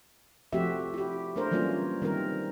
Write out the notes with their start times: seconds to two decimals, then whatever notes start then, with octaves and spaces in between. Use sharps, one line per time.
0.53 F3 A3 C4 F#4 G4 E5
0.94 E4 G4
1.36 A3 D4 A#4 C5
1.51 E3 F#3 G3 A#3 C#4 F4
2.02 D#3 G3 C4 A#4